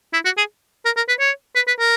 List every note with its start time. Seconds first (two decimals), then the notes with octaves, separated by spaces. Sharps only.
0.14 E4
0.25 F#4
0.38 G#4
0.86 A#4
0.97 A#4
1.09 B4
1.20 C#5
1.56 B4
1.68 B4
1.80 A#4